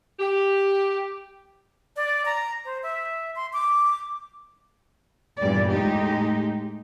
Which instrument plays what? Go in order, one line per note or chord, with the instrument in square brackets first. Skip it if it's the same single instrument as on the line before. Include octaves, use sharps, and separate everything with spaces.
[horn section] G4
[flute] D5
A#5
C5
E5
C6
D6
[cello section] E2 G2 A#2 G3 D5
A2 G#3 D#4 G4